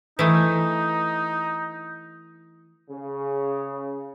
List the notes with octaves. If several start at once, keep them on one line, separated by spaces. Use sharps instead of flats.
E3 A3 D#4
C#3